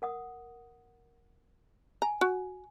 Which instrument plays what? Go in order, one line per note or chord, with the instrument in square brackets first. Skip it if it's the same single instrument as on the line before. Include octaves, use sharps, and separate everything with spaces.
[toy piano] A#4 F#5 D#6
[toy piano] G#5 [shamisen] A#5
[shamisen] F#4